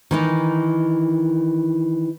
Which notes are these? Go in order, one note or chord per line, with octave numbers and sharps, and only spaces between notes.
D#3 E3 D#4